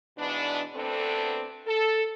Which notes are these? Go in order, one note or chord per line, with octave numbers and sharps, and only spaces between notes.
G#2 B2 E3 B3 D4
D2 B3 C4 D4 A4
A4